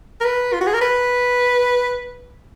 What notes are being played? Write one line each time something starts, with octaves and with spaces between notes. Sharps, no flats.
A#4
B4
F4
F#4
G#4
A#4
B4